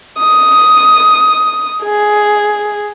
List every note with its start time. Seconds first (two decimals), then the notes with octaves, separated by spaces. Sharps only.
0.19 D#6
1.84 G#4